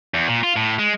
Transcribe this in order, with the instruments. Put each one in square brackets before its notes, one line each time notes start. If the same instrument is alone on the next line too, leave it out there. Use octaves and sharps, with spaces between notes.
[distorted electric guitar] E2
A#2
F4
A2
G#3